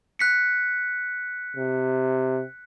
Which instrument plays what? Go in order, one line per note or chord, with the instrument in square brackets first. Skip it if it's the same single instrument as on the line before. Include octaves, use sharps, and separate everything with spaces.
[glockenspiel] F#6 B6 C#7
[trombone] C3